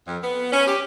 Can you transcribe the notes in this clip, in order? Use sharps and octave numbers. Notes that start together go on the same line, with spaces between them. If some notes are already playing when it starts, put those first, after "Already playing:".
F2
B3
C#4
G4